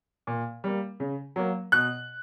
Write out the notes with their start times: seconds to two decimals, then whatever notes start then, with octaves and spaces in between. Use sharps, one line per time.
0.27 A#2
0.64 G3 A#3
1.00 C#3
1.36 F#3 A#3
1.72 B2 F#6